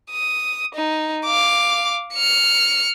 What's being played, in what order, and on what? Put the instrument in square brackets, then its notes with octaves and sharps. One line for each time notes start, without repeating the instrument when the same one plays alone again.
[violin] D#6
D#4
F5 D6
F6 C#7